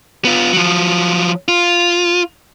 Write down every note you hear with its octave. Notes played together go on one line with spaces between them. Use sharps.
B3 F4
F3 F#3
F4